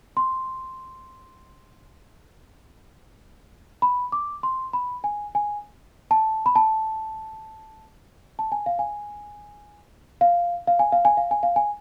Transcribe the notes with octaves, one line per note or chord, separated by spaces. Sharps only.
C6
B5
D6
C6
B5
G#5
G#5
A5
B5
A5
A5
G#5
F5
G#5
F5
F5
G#5
F5
G#5
F5
G#5
F5
G#5